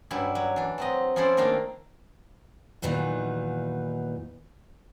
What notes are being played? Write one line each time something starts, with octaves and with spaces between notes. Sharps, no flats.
G2 F#3 G3 C#4 E4
F#3
E3 D4
F#3 C4 D#5
F3 C#4 E4 A4 C5 D5
D#3 A3 A#3 D4 F5 G5
E2 A#2 D#3 E3 F#3 D#4